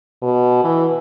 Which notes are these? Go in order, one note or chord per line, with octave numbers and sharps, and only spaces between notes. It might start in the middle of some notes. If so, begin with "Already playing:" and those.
B2
E3